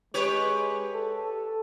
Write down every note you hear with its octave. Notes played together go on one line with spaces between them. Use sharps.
G#3 G4 B4 C#5
A4